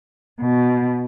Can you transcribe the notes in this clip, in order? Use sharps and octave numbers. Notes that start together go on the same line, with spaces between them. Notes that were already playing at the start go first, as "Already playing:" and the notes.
B2